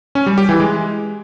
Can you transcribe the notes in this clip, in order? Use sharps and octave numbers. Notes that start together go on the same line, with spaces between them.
C#4
G3
G4
E3
G#3